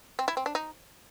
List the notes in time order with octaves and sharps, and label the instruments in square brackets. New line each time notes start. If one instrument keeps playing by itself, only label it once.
[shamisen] C4
E4
C4
D4
D#4